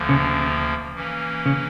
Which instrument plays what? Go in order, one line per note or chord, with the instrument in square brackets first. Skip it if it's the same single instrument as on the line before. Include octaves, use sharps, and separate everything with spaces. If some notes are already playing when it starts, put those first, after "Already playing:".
Already playing: [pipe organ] D2 D3 F3 A#3
[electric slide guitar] C#3
[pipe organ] E3 A#3 C#4
[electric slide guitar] C#3